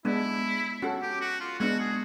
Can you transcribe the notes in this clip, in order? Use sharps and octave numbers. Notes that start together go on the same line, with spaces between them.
G#3 B3 D4 E4
C#4 F#4 A4
G4
F#4
F4
G#3 B3 D4 F#4
G#4